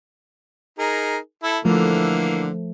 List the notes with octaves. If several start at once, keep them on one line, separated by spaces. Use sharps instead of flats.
D#4 G#4 A#4
E4 A4
D3 E3 F3 A3 A#3